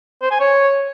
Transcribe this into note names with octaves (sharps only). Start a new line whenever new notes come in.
C5
G#5
C#5